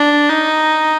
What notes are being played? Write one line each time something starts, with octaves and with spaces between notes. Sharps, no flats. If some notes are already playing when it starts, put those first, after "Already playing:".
Already playing: D4
D#4